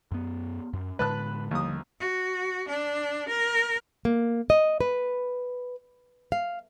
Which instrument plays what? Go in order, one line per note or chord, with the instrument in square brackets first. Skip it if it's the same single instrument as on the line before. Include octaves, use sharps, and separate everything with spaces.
[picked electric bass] F#2 B3
F#2
[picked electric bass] A2 D3 G#3 [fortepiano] B4 A5 F#6
[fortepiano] D#2 D#6 [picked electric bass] D3 F3 G3
[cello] F#4
D4
A#4
[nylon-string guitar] A#3
D#5
B4
F5